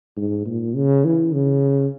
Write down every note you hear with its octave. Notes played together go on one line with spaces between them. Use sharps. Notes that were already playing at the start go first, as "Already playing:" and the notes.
G#2
A#2
C#3
E3
C#3